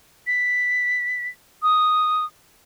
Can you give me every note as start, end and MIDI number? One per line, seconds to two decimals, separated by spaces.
0.27 1.28 95
1.63 2.25 87